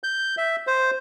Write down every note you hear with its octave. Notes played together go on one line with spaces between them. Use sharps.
G6
E5
C5